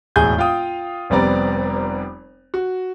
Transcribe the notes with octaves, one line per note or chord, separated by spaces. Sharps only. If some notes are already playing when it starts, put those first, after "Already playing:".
E1 A2 G#4 G#5 G6
F4 F5 G5 D#6
F1 G3 B3 C4 D5 A#5
F#4